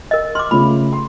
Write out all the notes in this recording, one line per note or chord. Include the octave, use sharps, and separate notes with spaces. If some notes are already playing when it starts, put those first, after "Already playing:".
A#4 D#5
C6 D6 F6
C#3 A3 F4 B5
C6